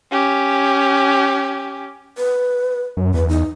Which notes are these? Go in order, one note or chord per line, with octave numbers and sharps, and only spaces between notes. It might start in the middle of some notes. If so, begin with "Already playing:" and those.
C#4 G4
B4
F#2
E2 B4
D#4